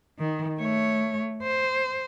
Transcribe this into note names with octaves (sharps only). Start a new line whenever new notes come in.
D#3
A3 C#5
C5